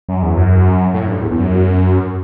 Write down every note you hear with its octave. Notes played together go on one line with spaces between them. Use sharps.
F#2
E2
F#2
A2
G2
E2
E2
F#2